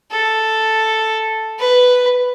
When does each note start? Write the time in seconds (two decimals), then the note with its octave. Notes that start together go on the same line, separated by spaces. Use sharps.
0.12 A4
1.59 B4